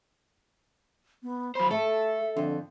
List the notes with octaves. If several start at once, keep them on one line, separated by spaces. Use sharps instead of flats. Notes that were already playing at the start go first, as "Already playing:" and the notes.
B3
F#3 C5 B5
A3 A4 E5
F2 D3